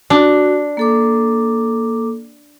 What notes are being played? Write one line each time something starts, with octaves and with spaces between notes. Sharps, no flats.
D4 F#4
A#3 A4 D6